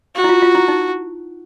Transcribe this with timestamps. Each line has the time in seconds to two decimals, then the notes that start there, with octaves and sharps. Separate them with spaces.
0.16 F#4
0.24 E4
0.29 F4
0.42 F4
0.55 E4
0.68 D#4